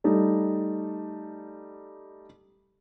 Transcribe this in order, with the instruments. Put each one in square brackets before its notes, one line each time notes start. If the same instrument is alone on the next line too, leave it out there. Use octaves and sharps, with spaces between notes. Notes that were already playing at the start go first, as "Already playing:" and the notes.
[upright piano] G3 A3 D#4